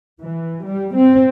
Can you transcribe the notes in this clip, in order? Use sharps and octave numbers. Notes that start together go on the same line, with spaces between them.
E3
G3
C4